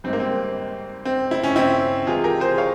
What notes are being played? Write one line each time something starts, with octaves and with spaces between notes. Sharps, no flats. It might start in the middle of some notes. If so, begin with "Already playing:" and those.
G#1 G#2 G3 C4
A#3
C4
C4
E4
C#4
C4 E4
C#2 C3 E3 F4 G#4
G4 A#4
G#4 C5
C#5 F5